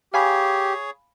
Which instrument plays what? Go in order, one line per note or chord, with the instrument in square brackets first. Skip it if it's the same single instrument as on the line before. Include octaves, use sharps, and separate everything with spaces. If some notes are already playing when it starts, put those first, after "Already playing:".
[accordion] G4 [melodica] G#4 C#5 [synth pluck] F5 G#5 B5